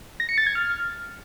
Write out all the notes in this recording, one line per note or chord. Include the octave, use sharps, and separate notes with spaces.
A#6
C#7
A6
G#6
F6